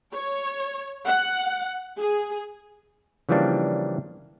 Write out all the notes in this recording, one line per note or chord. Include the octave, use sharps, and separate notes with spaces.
C#5
F#5
G#4
C#3 E3 F3 G3 A#3 D4